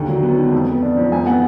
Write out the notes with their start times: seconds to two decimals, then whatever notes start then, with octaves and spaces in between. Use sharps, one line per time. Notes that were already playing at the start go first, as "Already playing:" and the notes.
Already playing: D#2 D3
0.08 F#3
0.23 B3
0.38 D#3
0.53 F2
0.68 B3
0.82 D4
0.97 F3
1.12 F2 G#5
1.26 B3 F#5